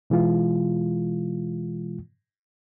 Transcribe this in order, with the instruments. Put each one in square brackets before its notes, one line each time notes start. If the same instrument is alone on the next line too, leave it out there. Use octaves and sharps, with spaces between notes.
[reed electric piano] B2 E3 G#3 F4